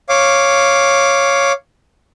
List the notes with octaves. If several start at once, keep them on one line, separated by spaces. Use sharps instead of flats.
C#5 F5 D6